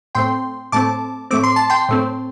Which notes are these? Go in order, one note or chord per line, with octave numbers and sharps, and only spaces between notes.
A2 A3 C4 G5 C6
A2 A3 C4 A5 D6
A2 A3 C4 D6
C6
A5
G5 C6
A2 A3 C4